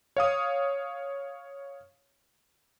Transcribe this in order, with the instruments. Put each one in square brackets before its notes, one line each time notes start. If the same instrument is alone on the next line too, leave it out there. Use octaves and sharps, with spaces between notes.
[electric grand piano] C#5 F5 D#6